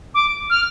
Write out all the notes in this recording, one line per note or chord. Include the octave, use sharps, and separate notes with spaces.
D6
F6